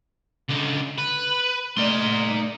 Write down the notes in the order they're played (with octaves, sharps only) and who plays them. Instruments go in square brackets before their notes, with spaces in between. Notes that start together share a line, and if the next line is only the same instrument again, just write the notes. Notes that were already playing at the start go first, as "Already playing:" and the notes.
[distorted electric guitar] C#2 D3
B4
[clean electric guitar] A3 A#3 D5 [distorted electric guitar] D#4 C6